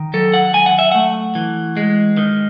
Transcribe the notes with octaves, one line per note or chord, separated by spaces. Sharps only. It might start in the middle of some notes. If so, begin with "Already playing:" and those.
Already playing: D#3
F#3 A4
F#5
F#3 G#5
F#5
E5
A3 F#5
E3
G#3
D#3